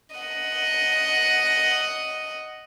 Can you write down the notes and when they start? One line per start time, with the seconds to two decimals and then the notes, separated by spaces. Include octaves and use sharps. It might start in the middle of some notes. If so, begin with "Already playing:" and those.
0.16 D#5 F#5